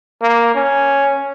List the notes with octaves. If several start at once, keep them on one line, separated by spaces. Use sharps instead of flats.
A#3
C#4